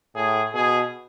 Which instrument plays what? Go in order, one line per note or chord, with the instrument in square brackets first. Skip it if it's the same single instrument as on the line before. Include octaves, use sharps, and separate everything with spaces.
[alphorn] A2 [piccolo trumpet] G#4
[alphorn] B2 [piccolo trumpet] G#4